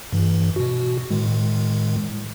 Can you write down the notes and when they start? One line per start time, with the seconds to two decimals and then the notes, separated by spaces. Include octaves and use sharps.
0.12 G2 E3
0.56 B2 F#4
1.11 A2 D#3 G#3